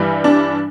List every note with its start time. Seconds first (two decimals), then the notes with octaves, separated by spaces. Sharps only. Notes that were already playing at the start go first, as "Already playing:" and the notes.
Already playing: G2 E3 G3
0.24 D4